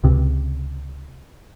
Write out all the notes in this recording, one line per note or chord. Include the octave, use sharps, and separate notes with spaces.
C#2 C3